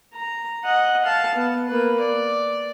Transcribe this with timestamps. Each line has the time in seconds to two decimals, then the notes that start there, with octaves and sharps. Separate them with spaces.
0.13 A#5
0.64 D#5 F#5
1.04 F5 A5
1.35 B3
1.68 A#3 B4
2.00 D5